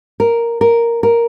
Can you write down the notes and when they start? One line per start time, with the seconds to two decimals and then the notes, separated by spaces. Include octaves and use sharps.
0.20 A#4
0.61 A#4
1.03 A#4